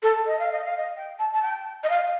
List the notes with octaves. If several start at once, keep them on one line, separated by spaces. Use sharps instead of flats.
A4
D#5
F5
D#5
F5
D#5
G5
A5
A5
G5
D#5
F5